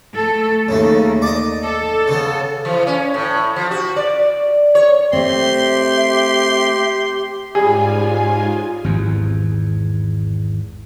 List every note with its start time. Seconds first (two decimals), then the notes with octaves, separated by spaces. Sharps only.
0.17 A3 A4
0.68 D#2 C#3 A3
1.22 D5 D#5
1.64 A4
2.08 C#3 B3
2.65 E3
2.87 C#4
3.14 A2
3.56 F3
3.71 F#4
3.96 D5
4.75 C#5
5.13 A3 C4 G4 E5 C6
7.55 G#2 G3 C#4 F4 G#4 G#5
8.84 G#1 E2